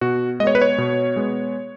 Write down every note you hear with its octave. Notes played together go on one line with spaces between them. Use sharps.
B2 F#4
G#3 B3 C#5 D#5
B4
C#5
B2
G#3 B3